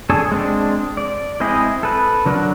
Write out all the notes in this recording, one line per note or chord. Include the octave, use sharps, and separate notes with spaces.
D4 G#4 A4 C#5
G#3 C4 D4
D5
G#3 C4 E4 G#4 D#5
A4 B4
D3 F#3 D4 A#4 F#5